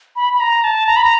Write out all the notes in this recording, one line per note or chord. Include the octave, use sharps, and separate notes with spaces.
B5
B5
A#5
A5
A#5
B5
A#5